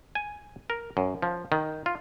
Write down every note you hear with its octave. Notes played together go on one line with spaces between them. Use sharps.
G#5
A#4
F#2
F3
D#3
F4